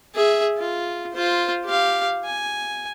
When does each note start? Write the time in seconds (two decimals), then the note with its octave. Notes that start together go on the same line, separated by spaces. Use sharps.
0.15 G#4 E5
0.58 F4
1.13 F4 C5
1.65 G4 F5
2.25 G#5